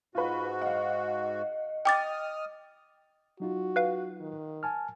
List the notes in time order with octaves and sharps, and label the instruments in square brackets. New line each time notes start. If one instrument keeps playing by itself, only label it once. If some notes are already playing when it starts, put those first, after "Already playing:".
[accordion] G#2 F#4 [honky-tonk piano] F4 B4
[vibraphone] D#5 [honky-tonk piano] F5 F#5
[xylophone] G5 D6 A6 [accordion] D#6 F6
[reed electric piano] F#3 D#4 F4 [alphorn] F#4
[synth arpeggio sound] B4 F5
[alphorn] D#3
[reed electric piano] G#5 A5 F6